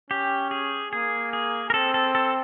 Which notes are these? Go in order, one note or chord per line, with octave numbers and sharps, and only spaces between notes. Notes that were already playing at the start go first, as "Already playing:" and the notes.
C#4 G4
G#4
A#3 G#4
G#4
A#4
C4 A4
A4
A4